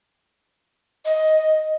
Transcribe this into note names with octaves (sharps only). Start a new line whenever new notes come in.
D#5